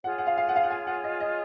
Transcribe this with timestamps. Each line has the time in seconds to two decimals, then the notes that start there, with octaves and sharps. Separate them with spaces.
0.04 F4 G#4 C#5 F#5
0.18 F#5
0.27 F5
0.37 F5
0.49 F#5
0.56 F5
0.63 F#5
0.71 G#5
0.87 F#5
1.04 D#5
1.20 D#5